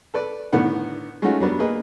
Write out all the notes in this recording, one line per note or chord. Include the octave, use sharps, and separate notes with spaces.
A4 B4 D5
A2 D3 D#3 B3 F#5
G#3 A3 C#4 D#4 F4 F#4
F#3 G3 B3 D4
A#3 G#4 B4 D#5